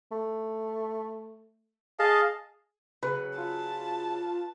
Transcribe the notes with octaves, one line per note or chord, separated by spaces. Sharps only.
A3
G#4 D#5 F5 A5
C#3 F#3 B4
F4 A5